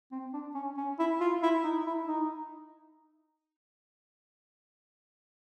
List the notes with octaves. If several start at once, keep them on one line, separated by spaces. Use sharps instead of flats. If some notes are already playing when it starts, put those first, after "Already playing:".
C4
D4
C#4
C#4
E4
F4
E4
D#4
E4
D#4